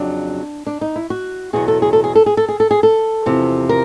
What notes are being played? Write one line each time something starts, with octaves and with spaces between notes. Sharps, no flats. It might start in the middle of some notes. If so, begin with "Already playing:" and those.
Already playing: F2 C#3 F#3 D4
D4
D#4
E4
F#4
E2 B2 F#3 G#4
A4
G#4
A4
G#4
A4
G#4
A4
G#4
A4
G#4
A4
E2 C3 F3
A#4